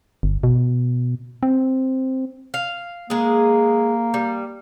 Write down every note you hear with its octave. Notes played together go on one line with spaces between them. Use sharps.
G1
B2
C4
F5
G#3 A#3 G#4
G3